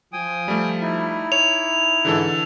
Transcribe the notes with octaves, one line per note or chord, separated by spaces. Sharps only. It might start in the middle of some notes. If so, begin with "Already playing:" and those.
F3 G5 G#5 D#6
G3 A3
D#4 E4
C#5 F7
G#2 D3 E3 A4